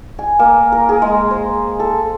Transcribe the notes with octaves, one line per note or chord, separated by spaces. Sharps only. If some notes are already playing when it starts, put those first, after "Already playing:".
G#5
A#3
A#4
G#4
G#3
C5
A4